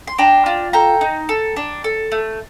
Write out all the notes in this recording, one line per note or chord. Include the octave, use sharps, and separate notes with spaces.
C6
D4 G5 A#5
F4
A4 G5 A#5
D#4
A4
D4
A4
A3